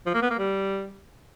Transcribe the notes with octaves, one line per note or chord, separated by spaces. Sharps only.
F3
A#3
B3
A#3
G3